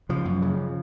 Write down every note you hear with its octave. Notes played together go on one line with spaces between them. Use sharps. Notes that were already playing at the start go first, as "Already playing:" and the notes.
C#3 F3
F#2
C#3